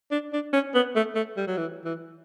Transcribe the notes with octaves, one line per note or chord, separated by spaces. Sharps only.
D4
D4
C#4
B3
A3
A3
G3
F#3
E3
E3